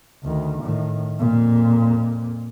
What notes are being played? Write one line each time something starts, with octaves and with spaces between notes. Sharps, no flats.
D2 D#3
A2 D#3
F2 A#2